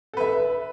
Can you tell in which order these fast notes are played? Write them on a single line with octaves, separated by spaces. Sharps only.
A4 B4 E5